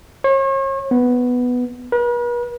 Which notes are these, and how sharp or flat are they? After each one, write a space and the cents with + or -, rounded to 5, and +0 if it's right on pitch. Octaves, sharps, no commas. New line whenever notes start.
C#5 -40
B3 +0
B4 -45